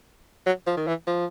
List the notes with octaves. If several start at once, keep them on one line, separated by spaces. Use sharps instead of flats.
F#3
F3
D#3
E3
F3